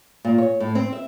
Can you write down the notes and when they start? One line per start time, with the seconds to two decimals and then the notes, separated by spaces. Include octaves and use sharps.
0.25 A#2
0.38 C#5
0.60 A2
0.75 C4
0.93 E5